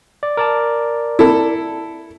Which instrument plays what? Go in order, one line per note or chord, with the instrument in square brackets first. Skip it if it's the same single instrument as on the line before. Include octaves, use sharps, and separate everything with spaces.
[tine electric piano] D5
A#4 D5 A5
[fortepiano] E4 A4